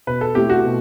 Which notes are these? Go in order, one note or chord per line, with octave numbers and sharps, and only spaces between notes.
B2 B4
A4
A3 C4 E4 G4
F#4
B2